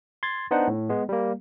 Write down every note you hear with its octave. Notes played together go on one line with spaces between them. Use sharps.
C6 G#6 A6
B3 D4 D#4 C5 F#5
A2
G#3 B3
G3 A#3